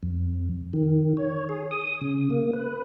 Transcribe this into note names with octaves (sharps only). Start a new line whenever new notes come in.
F2
D#3
C#5
G#4
D#6
C#3
A#3
B4